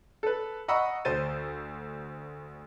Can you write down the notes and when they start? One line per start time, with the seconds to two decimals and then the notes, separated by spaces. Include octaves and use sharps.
0.23 A4 B4
0.68 D#5 F#5 A#5 B5 C#6 E6
1.05 D2 C5 G6 A6 D#7